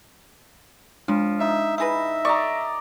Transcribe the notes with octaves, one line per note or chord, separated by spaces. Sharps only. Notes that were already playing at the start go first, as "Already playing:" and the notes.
F3 G#3 D4
D#4 E5
E4 G#4 B4 E5 E6 A#6
D5 D#5 A#5 C#6